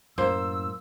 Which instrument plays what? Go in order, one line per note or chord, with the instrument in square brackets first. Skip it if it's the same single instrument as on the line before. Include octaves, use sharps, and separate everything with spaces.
[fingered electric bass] F#2 A2 [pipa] A#3 C5 [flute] E6